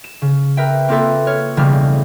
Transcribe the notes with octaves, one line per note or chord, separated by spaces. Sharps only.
E7
C#3
A#4 B4 E5 G5
A#3 C4 F4 A4 B4 E5
C#5 F6
E1 C#3 G3 A3 F6